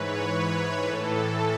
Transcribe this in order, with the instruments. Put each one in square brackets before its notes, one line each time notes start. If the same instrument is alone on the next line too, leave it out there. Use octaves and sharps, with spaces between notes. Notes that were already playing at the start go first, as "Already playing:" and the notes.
Already playing: [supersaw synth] G#2 E3 B4 C#5
B4
A2 E3 A4